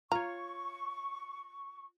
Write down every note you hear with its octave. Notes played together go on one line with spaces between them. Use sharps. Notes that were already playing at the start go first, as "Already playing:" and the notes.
F4 C#5 A#5 C#6